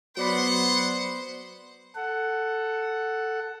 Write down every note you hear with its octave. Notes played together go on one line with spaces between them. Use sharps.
F#3 B3 C5 D5 F#5 B5 C6
A4 F#5